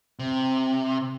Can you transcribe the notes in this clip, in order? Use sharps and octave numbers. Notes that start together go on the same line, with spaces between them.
C3